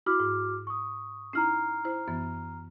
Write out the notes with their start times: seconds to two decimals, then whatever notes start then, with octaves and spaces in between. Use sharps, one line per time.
0.06 E4 F#4 D6 F6
0.20 G#2
0.67 C#6 D#6
1.33 C#4 D#4 E4 A#5 F6 C7
1.85 E4 C5
2.08 F#2 E3 B3